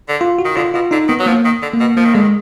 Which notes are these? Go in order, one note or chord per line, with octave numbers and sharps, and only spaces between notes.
D3
F4
F#4
D#3
D3 F4
B2 F4
D3 D#4
D#3 B3
F#3
F3 A#3
D#3
D3
A#3
B2
F3 A#3
D#3
D3 G#3
D#3